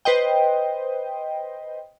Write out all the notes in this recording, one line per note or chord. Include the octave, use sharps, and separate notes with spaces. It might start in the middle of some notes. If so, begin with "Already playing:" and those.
B4 C5 D#5 G5